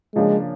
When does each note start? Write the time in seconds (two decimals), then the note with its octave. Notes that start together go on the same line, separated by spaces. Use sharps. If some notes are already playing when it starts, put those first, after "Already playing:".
0.14 C#3 F3 G#3 A#3 D4